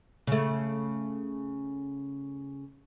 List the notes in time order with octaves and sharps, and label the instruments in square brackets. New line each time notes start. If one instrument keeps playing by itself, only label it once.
[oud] C#3 A3